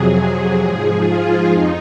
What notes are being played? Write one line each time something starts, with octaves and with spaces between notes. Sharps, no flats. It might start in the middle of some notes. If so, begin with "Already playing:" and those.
Already playing: F2 C3 F#3 G#4
F3
G#2
F4
F2 D#4